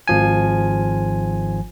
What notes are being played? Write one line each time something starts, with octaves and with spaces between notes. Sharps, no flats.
G#1 F3 G#5